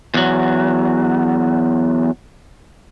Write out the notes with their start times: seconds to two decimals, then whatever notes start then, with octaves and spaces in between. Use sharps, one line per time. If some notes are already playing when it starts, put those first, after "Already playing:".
0.14 E2 F#3